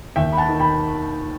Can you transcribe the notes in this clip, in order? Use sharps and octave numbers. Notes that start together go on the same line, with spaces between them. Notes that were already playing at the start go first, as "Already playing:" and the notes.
D#2 E5 G5
B5
F#5 A5
D#3
G5 B5